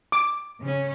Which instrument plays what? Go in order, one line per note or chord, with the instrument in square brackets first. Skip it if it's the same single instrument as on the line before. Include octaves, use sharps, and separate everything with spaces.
[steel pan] D6
[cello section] C#3 C#4